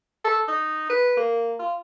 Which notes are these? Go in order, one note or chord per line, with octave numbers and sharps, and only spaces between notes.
A4
D#4
B4
A#3
F4